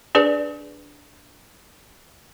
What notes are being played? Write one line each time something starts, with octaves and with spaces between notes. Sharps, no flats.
D4 G#4 B4 D5